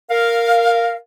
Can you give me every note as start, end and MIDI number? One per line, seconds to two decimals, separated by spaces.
0.10 0.96 70
0.10 0.96 77